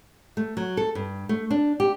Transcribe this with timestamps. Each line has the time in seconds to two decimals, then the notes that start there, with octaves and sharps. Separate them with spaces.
0.37 A3
0.57 F#3
0.77 A4
0.95 G2
1.29 A3
1.50 D4
1.80 G4